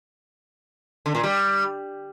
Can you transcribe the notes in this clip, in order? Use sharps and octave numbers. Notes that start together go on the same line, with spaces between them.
D3
A#2
G3